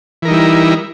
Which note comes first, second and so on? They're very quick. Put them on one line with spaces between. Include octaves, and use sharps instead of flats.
E3 A#4 D#4 G3 E4